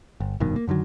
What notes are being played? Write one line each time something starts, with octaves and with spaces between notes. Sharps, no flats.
G1
F1 G2 B2 D#3
A#3
F#2 D3 D#3 F#3